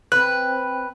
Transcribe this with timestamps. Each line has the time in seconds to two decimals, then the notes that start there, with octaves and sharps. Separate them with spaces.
0.12 C4 B4 F#6